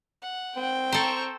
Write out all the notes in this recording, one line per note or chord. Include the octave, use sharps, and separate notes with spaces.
F#5
C4 G5
A4 C5 A#5 C#6